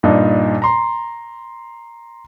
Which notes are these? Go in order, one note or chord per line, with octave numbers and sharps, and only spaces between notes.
G2 A#2 D4 D#4
A#5 C6